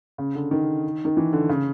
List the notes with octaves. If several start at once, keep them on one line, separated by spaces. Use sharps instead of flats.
C#3
D3
D#3
D#3
E3
D3
C#3